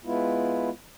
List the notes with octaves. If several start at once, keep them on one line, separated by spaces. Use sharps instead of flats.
G#3 B3 E4 F4